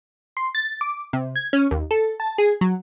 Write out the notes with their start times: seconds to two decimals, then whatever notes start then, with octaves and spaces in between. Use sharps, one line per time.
0.37 C6
0.55 A6
0.81 D6
1.13 C3
1.36 G#6
1.53 C#4
1.71 D#2
1.91 A4
2.20 A5
2.38 G#4
2.61 F#3